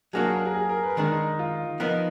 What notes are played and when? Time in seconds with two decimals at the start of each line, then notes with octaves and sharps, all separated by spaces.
0.13 F#3 A#3 D4 F#4 G#4
0.24 A#4
0.35 A#4
0.45 G#4
0.55 G#4
0.69 A#4
0.83 B4
0.97 D#3 G#3 D4 A#4
1.11 D#4
1.39 F4
1.80 F3 B3 D#4 A#4